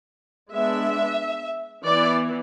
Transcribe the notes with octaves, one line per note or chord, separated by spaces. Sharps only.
G#3 B3 D4 E5
E3 B3 E4 D5